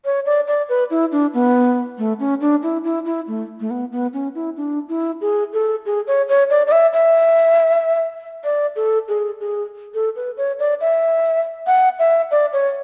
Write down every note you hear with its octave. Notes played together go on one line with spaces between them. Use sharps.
C#5
D5
D5
B4
E4
D4
B3
A3
C#4
D4
E4
E4
E4
A3
A3
B3
B3
C#4
E4
D4
E4
G#4
A4
G#4
C#5
C#5
D5
D5
E5
E5
D5
A4
G#4
G#4
A4
B4
C#5
D5
E5
F#5
E5
D5
C#5